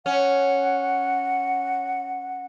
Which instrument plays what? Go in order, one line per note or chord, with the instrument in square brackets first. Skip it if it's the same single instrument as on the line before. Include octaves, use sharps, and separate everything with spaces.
[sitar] C#4 [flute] F#5